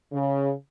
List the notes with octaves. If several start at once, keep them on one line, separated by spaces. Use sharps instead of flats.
C#3